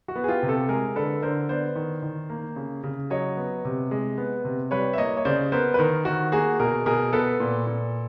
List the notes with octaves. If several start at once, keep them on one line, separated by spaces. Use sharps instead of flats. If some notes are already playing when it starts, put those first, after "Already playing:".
F#4
B3
G#4
F4 G4
C3
G4 A4
G#3 G#4 A#4
D3 A4 B4
D3 A#4 C5
B3 C5 D5
D#3
D#3
A#3
C#3
C#3
F#3 C#5 D#5
B3
C3
G#3
B3
C3
G3 B4 C#5
E5
A#3 C#5 D#5
C#5
C#3 C5 D5
B3 A#4 C5
B4
D#3 A#4 C5
D#3 F#4
A#3 F#4 G#4
B2 G#4 A#4
B2 G#4 A#4
B3 A4 B4
A#2
A#2